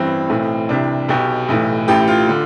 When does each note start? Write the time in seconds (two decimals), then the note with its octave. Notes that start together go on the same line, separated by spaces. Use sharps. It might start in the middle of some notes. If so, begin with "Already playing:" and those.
Already playing: A1 G2 E3 C4
0.29 B1 A2 E3
0.69 C2 C3 E3 D4
1.09 B1 B2 G4
1.48 B1 A2 E3
1.88 A1 A2 E3 G4
2.08 F4
2.29 D3